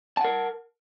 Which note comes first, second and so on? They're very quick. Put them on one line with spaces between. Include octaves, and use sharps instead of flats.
A5 F#5 A#4